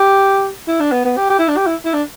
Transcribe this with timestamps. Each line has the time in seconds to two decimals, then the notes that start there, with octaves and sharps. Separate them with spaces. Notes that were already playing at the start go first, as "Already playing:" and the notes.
Already playing: G4
0.68 E4
0.80 D4
0.92 B3
1.05 B3
1.17 G4
1.30 G4
1.39 E4
1.48 D4
1.57 G4
1.66 E4
1.85 E4
1.94 D4